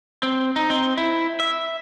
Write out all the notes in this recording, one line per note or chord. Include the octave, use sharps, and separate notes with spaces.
C4
D#4
C4
E4
E5